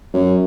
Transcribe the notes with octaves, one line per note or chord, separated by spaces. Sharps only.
F#2